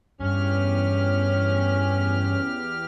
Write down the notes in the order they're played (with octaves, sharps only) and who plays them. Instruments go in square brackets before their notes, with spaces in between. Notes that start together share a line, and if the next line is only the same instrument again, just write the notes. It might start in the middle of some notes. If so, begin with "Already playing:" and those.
[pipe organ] E2 G4 F6 [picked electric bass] G2 [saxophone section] C#4